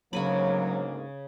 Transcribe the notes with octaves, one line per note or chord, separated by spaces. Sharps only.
D2 G#2 C#3 F#3 A#3 G#5 B5